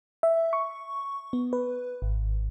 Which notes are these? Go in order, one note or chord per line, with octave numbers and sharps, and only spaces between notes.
E5
C#6
B3
B4
G#1